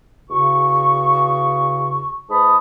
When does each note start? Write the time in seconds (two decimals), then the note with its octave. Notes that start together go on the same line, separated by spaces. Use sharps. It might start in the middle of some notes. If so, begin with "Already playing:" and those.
0.30 E2 C#3 F#4 C#6
2.30 G#2 B4 A5 B5 D#6